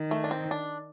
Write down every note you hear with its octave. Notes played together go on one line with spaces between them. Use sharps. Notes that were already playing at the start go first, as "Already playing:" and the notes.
Already playing: D#3
A3
D4
C4
D4